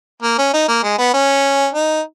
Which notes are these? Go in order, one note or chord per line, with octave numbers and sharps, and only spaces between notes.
A#3
C#4
D#4
A#3
G#3
B3
C#4
D#4